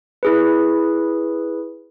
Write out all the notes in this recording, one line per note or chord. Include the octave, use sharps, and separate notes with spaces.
E4 G#4 B4